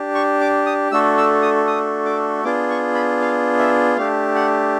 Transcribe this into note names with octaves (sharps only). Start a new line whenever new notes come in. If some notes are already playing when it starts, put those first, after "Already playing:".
Already playing: D4 G4
C#6
D6
D#6
A3 D4 F#4 A4 E6
E6
D#6
D#6
D6
B3 D4 F4 G#4 D6
C#6
B5
F5
E5
A3 D4 G4 F5
F#5